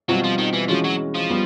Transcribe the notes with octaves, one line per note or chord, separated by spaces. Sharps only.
B2 F#3 G3 C4 F4
F3
D#3
E3
E3 F3 G#3 C#4 F#4
F#3
F3
G3 B3